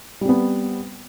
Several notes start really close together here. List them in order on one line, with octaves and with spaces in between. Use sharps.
G3 C4 B3